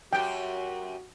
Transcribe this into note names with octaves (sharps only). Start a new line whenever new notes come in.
F#2 F#4 G4 G5